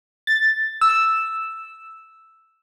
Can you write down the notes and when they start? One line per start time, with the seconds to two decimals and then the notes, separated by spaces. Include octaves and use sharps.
0.27 A6
0.81 E6